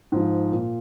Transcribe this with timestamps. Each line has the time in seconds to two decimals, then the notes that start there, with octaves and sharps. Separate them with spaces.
0.12 G#2 F3
0.52 A#2